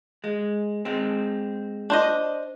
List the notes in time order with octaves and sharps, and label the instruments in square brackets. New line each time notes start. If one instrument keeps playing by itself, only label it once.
[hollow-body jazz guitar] G#3
G#3 C4
[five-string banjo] D4 C5 D#5